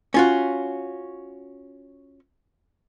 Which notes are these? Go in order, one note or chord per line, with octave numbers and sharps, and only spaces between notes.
C#4 F4 F#4